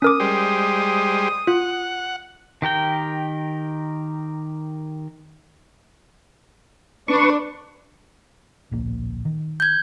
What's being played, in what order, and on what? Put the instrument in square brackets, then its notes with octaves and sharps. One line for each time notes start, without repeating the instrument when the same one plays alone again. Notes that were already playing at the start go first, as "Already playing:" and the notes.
[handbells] C#4 A#4 D6 [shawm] D#6
[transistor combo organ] G3 G#3 C5
[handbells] F4 [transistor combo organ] F#5
[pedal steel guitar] D#3 G4 A#4 G5
[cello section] D4 [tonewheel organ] B4 C#6
[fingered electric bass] D1 A#1 A#3
D#3
[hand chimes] G6 G#6